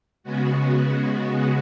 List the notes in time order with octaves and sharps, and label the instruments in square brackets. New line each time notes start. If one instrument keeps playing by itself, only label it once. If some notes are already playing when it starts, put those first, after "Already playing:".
[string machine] C#3 G#3 B3 F#4